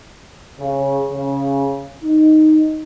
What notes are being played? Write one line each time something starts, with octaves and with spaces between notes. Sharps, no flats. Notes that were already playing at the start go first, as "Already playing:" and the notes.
C#3
C#3
D#4